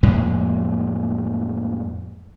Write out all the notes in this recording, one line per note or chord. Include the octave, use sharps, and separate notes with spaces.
F2 A2 G#3 A#3